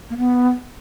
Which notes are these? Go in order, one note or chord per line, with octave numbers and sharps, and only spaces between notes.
A#3
B3